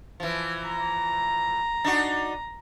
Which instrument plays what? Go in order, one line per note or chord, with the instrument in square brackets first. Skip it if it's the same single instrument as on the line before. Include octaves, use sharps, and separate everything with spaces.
[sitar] E3 F3
[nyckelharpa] A#5
[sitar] D4 D#4 F#4